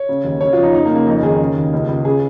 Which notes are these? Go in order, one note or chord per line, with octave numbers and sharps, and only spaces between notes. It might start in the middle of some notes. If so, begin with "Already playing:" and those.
Already playing: C#5
C#3
D#2
C#3 C#5
F2 F4
D#4
C#3 D#4
A#3
C#3
A#3
F2 D#4
D#3 G#4
C#3
D#2
C#2
C#2
C#3 G#4